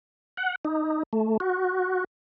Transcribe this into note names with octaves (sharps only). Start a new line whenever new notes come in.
F#5
D#4
A3
F#4